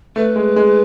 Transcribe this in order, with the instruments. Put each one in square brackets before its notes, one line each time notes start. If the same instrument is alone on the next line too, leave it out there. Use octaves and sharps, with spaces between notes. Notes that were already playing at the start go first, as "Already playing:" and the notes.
[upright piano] A3 [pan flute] B4
[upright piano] G#3
G#3